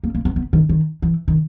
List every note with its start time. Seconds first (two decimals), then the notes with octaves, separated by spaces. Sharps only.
0.04 A#3
0.15 A#3
0.25 B3
0.36 B3
0.53 D#3
0.69 D#3
1.02 E3
1.28 D#3